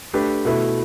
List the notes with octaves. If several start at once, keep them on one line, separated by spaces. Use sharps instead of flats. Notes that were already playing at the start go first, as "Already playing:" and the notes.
A3 D4 G4 B4
B2 A3 E4 B4